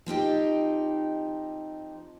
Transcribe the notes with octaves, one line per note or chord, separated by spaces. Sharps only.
F3 C4 D#4 G4